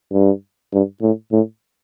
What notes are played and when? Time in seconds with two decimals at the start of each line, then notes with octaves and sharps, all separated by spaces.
0.12 G2
0.73 G2
1.02 A2
1.32 A2